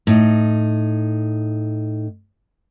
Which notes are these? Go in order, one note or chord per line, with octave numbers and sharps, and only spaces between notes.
A2 D#4